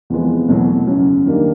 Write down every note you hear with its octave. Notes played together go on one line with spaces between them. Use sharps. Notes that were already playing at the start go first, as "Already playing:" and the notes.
E2 C3 F3 G#3 B3
E2 B2 F#3 A3
F#2 C#3 F#3
D#3 G3 A#3 D4